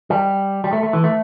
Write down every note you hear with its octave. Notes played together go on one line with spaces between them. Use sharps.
G3
G3
A3
A3
E3
A3